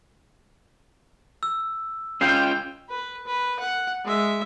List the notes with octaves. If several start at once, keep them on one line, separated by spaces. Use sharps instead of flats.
E6
C#4 F4 G5 G6 C7
B4
B4
F#5
G#3 E5